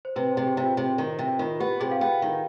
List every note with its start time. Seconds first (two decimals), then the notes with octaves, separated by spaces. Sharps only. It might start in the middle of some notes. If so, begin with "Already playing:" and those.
0.05 C5
0.16 C3 B4
0.31 C5
0.37 C3
0.42 G#4
0.47 G4
0.57 C3
0.63 F4
0.77 C3
0.98 D#3
1.19 C3
1.39 D#3 F4
1.60 B3 G4
1.80 C3 G#4
1.91 F5
2.01 B3 G5
2.22 D#3